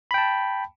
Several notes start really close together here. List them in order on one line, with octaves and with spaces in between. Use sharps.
B5 G5 A5